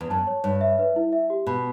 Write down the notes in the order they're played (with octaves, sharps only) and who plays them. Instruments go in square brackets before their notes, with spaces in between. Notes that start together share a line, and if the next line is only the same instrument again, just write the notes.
[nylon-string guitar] E2
[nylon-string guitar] F#2 [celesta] A5
[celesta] C#5
[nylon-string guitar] G2 [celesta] C#5
[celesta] E5
B4
E4
E5
G4
[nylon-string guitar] B2 [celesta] B5